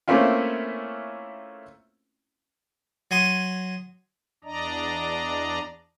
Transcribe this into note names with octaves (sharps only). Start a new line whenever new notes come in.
A3 A#3 C4 C#4 E4 F4
F#3 G#5 C6 D#6
E2 D4 D5 D#5 A#5